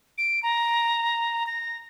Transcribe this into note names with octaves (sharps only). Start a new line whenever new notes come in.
D7
A#5
A#6